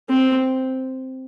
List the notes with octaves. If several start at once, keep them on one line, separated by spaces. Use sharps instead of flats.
C4